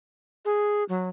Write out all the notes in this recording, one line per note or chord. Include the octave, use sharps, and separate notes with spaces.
G#4
F#3